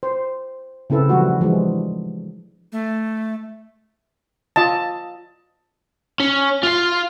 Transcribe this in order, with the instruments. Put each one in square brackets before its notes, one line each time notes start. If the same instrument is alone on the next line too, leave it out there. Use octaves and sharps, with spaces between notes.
[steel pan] C5
C#3 C4 E4 A4 B4
E3 F3 G3 A3 F#4
E3 F3 G3 G#3 D4
[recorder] A3
[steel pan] F4 D#5 A5
[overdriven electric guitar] C#4
F4 F5